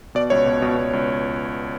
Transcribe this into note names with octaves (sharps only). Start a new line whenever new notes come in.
B2 D5
C#2 C#5
B2
B2
B2
C#2